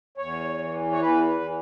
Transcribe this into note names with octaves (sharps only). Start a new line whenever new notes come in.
E2 C#5
E3
C#5
E2 B4
B4
E3